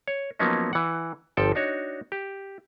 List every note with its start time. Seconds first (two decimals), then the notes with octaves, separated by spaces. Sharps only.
0.08 C#5
0.39 F3 F#3 A#3 B3 C#4 D#4
0.73 E3 F#5
1.37 G1 F3 A4 G5
1.55 D4 D#4 F#4 C#5
2.12 G4